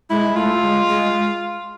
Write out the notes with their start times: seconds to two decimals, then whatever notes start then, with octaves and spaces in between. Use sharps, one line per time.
0.10 G#3 E4
0.36 A3 F4
0.62 G#3
0.88 G#3